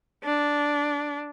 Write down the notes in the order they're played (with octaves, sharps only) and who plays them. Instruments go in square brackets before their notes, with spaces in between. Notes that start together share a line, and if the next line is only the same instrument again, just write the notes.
[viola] D4